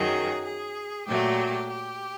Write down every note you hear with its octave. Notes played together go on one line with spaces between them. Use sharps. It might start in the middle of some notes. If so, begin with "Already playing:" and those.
Already playing: F#2 D#3 F#3 G#4
G#4
A#2 F#3 A3 G4
G4